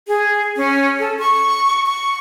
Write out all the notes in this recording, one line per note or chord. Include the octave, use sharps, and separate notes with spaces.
G#4
C#4
A4
C#6
C#6